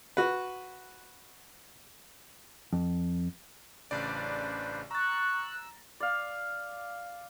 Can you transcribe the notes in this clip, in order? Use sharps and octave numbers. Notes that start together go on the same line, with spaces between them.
F#4 B4
F2
A1 C#3 D4 B4 C5 D5
A#5 C#6 E6 F#6 A6
D5 F5